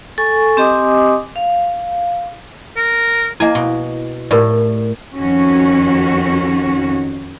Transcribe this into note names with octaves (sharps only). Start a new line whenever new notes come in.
A4 G#5 C#6
C4 G4 D#5 G#5 D6 D#6
F5
A#4
A#3 E4 D#5 G#5
B2
A2 G4 A#4 D5
F2 D#3 C#4 F#4